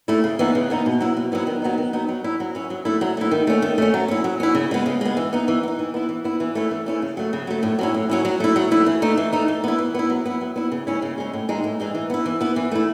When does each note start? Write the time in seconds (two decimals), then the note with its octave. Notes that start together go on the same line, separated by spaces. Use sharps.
0.08 A3 E4
0.24 C#3
0.39 E3 B3 D#4
0.55 C#3
0.70 E3 B3 D#4
0.86 B2
1.00 F#3 B3 E4
1.17 B2
1.32 F#3 B3 E4
1.47 D#3
1.62 F#3 B3 D#4
1.78 D#3
1.93 F#3 B3 D#4
2.09 F#3
2.24 C#4 E4
2.40 F#3
2.55 C#4 E4
2.70 F#3
2.85 A3 E4
3.01 F#3
3.17 A3 E4
3.31 D#3
3.47 A3 C#4
3.62 D#3
3.78 A3 C#4
3.94 F#3
4.08 C#4 E4
4.24 F#3
4.40 C#4 E4
4.55 C#3
4.71 G#3 B3
4.86 C#3
5.01 G#3 B3
5.17 E3
5.33 B3 D#4
5.48 E3
5.63 B3
5.68 D#4
5.79 E3
5.94 B3 E4
6.09 E3
6.24 B3 E4
6.40 E3
6.55 A3 C#4 E4
6.71 E3
6.86 A3 C#4 E4
7.02 C#3
7.17 F#3 A3
7.33 C#3
7.47 F#3 A3
7.63 A2
7.79 F#3 C#4 E4
7.94 A2
8.09 F#3 C#4 E4
8.25 F#3
8.40 A3 E4
8.56 F#3
8.71 A3 E4
8.86 E3
9.02 A3 D#4
9.17 E3
9.33 A3 D#4
9.48 E3
9.64 B3 E4
9.79 E3
9.94 B3 E4
10.10 F#3
10.26 B3 E4
10.41 F#3
10.56 B3 E4
10.72 C#3
10.87 G#3 C#4 E4
11.02 C#3
11.18 G#3 C#4 E4
11.33 A2
11.48 E3 G#3 D#4
11.64 A2
11.80 E3 G#3 D#4
11.95 E3
12.10 B3 E4
12.26 E3
12.41 B3 E4
12.56 E3
12.71 A3 E4